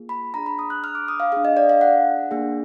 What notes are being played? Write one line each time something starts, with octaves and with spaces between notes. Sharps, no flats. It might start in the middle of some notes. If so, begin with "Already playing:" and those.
Already playing: A#3 F4 G#4
B5
D4 G#4 A#5
B5
D#6
F#6
F6
D6
D#6
F5
D4 G#4 F5
D#5
D5
F5
F#5
A#3 D4 G#4